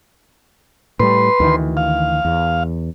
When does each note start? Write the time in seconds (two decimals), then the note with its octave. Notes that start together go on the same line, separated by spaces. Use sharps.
1.00 A2 G3 B4 C6
1.40 D2 D#3 E3
1.77 F5
2.25 E2